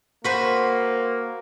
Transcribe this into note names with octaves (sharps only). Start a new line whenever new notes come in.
A#3 F#4 B4 C5